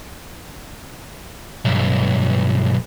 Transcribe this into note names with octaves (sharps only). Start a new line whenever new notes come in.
B1 G2